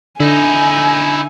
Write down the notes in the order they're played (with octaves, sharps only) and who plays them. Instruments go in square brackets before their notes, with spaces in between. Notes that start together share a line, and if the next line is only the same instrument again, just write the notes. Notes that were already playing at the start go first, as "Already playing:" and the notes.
[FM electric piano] D3 [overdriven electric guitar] D#4 E4 [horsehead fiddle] G#5